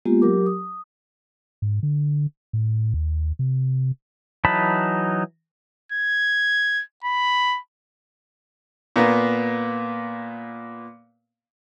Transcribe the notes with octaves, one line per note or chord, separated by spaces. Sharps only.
G#3 A#3 B3 F4 G4
F#3 G4 A#4 D6
D#6
G#2
D3
A2
D#2
C3
E3 F#3 D#4 A5 B5
G#6
B5
A#2 A#3 B3